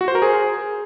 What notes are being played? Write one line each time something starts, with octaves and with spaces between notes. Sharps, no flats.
F#4
C5
A#4
G#4